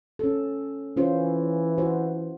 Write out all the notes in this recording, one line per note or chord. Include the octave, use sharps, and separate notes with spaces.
C#4 A4
E3 C#4 F4 C5
F#4 C5